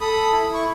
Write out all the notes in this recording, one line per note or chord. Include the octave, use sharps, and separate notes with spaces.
A4 B5 D#6
E4
C#6